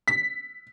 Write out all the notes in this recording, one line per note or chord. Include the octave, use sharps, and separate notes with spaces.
B6